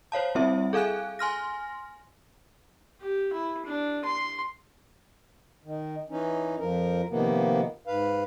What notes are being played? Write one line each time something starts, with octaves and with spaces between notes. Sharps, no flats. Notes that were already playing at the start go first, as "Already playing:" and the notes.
C5 C#5 F5 A5
G3 C4 E4 E5
G#4 A4 F5 G#5 F#6
G#5 C6 F6 A#6
G4
E4
D4
C6
D#3
E3 C#4 D#4
F2 F3 A#4
C3 D#3 F3 A#3 B3
G#2 B4 F5